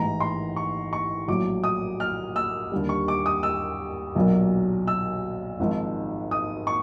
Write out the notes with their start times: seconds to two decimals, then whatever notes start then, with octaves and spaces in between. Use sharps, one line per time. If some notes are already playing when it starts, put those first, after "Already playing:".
Already playing: A1 G#2 E3 A#5
0.20 C6
0.56 C#6
0.93 C#6
1.28 A#1 A2 F#3 A3 D6
1.64 D#6
2.00 F6
2.36 E6
2.72 D#2 D3 G3
2.89 C#6
3.08 D6
3.26 D#6
3.43 E6
4.15 B1 A#2 F#3 A#3
4.87 E6
5.59 G#1 G#2 F3
6.31 D#6
6.67 C#6